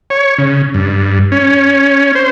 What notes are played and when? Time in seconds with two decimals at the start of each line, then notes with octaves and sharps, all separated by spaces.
0.10 C#5
0.38 C#3
0.74 G2
1.32 C#4
2.15 C5